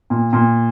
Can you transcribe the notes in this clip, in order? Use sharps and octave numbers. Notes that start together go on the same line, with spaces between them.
A#2
A#2